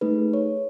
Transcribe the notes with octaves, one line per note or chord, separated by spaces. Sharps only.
A3 D#4 G#4 B4
C#5